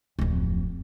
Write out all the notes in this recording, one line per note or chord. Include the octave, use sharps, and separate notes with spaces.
D1 F2